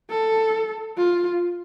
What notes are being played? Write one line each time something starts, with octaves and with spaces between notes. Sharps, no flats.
A4
F4